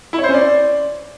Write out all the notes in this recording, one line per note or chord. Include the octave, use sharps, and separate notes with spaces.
E4
C#5
C5
C#4
D5